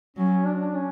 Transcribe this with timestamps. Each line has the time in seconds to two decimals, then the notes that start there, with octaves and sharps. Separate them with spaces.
0.16 F#3 C#4
0.45 D4
0.59 D4
0.75 C#4